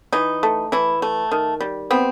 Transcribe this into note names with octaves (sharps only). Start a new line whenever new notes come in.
E3 D#4
A3
E3 E4
A3
D#3
G3
B3 C4